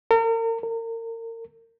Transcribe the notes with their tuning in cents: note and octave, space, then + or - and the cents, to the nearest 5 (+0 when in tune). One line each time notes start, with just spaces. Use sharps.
A#4 -40
A#4 -35